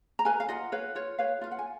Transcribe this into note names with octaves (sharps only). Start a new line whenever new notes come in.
A#5
B4 F5 G#5
F5
F4 D#5 F#5
B4 C#5 F5
F4 C#5
B4 C#5 F5
F4 F5
F#5
G#5